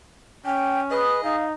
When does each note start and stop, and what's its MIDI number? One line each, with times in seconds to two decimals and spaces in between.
0.45 1.02 61
0.45 0.80 79
0.91 1.36 68
0.91 1.21 71
0.91 1.36 75
1.24 1.53 63
1.24 1.44 77